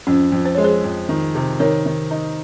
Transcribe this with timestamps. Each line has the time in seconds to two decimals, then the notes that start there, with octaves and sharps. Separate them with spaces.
0.07 F2 C#4
0.32 F2
0.45 C5
0.55 G#3 C#5
0.64 G#4 C5
0.84 F2
1.09 D#3
1.35 C3
1.60 D#3 A#4 C#5
1.86 D#3
2.11 D#4